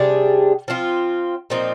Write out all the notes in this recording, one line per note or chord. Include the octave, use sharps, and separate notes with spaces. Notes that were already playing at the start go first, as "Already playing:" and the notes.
Already playing: C3 G3 D4 G#4
F3 C4 F4
A#2 F3 C4 D#4